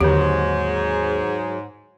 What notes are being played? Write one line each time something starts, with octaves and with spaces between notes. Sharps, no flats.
D#2 G#2 D3 F#3 G4